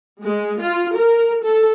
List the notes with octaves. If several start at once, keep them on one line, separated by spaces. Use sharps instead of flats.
G#3
F4
A#4
A4